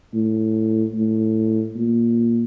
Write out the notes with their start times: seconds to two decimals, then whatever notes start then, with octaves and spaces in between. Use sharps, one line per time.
0.14 A2
0.96 A2
1.77 A#2